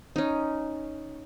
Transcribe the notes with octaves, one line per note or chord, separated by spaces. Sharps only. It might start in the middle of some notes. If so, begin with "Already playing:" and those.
C#4 D#4